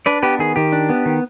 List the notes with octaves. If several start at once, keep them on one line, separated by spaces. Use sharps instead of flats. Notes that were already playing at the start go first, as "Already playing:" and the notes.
D4 B4 D5
B3 G4 B4
D#3 G#4
D#3 G4
D4
B3
D#3